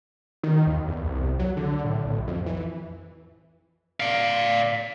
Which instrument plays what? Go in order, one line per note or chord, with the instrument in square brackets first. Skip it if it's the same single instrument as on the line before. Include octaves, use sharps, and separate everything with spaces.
[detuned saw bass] D#3
D#2
E2
C2
F#3
D3
A2
B1
F2
E3
[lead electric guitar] D5 F5